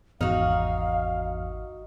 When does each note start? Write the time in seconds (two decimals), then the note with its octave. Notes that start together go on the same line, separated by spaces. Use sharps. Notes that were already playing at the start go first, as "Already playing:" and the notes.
0.21 G#1 E2 D#4 F#4 F5 F6